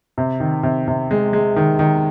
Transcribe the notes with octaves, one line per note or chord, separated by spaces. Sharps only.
C3
D#3
C3
C3
G#3
G#3
D#3
D#3